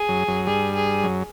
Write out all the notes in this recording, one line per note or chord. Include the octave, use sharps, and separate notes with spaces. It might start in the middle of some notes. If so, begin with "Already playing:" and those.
Already playing: G#4
F#2 F#3
F#2 F#3
G2 G3 G#4
G#4
F#2 F#3